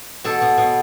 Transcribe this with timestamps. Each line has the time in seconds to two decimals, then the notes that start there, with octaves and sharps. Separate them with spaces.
0.24 B2 A4
0.42 B2
0.58 B2